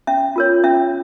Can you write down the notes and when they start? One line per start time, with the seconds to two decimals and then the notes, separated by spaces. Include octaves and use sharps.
0.07 C#4 E5
0.36 F4 A#4 C#5
0.64 C#4 E5